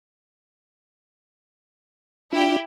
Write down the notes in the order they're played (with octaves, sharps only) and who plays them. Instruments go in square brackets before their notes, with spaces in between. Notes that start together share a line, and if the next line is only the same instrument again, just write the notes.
[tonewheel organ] D4 F4 [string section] E4 G4